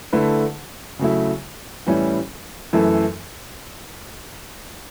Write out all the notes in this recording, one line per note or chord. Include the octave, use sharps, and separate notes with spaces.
D3 A3 E4 B4
C#3 F#3 A3 E4
A2 E3 G3 C#4 E4
F#2 E3 A3 E4 A4